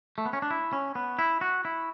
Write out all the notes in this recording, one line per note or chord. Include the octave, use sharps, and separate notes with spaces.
A3
B3
C#4
D4
E4
C#4
B3
E4
F#4
E4